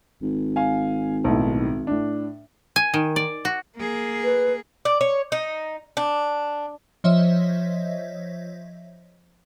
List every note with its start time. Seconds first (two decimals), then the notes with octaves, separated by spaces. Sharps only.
0.22 G#1
0.56 F5 G#5
1.24 B1 A2
1.87 A2 D4
2.76 G#5
2.94 D#3
3.16 D5
3.45 F#4
3.77 A#3 G#4
4.24 B4
4.85 D5
5.01 C#5
5.32 D#4
5.97 D4
7.04 F3 C5 C#5 D#5 E5